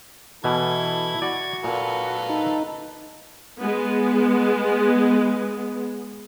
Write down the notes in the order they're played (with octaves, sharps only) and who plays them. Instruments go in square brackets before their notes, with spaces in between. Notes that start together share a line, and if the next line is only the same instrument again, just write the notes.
[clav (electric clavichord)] B2 E3 [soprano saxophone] E4 [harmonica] A4 [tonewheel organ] G#6
[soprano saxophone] F#4 [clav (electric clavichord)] D5
[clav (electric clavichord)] A#2 [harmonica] A4 B4 F5
[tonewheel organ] D#4
[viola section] G#3 B3